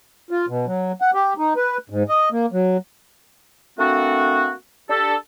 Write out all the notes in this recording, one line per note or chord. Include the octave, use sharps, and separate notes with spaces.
F4
B2
F#3
F#5
G4
D#4
B4
G#2
D#5
A#3
F#3
A3 A#3 C4 D4 F#4
D4 G4 A4